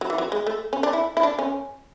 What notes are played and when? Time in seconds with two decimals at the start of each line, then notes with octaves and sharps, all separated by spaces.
0.01 F#3
0.10 E3
0.18 F#3
0.32 G#3
0.47 A3
0.73 C#4
0.83 D4
0.93 E4
1.17 E4
1.23 D4
1.39 C#4